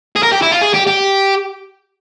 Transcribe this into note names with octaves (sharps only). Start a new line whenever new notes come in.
G#4
A#4
G4
E4
F4
G#4
G4
G4